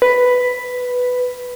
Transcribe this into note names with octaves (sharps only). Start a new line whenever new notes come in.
B4